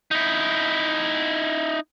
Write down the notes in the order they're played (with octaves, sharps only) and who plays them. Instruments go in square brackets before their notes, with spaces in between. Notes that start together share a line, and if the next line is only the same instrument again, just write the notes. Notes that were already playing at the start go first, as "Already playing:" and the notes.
[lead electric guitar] D#4 E4